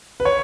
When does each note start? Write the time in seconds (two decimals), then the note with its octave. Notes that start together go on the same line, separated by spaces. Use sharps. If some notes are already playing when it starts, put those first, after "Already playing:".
0.20 B4
0.25 C#5